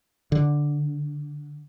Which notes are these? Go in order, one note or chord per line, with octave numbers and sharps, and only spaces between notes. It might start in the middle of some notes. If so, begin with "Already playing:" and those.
D3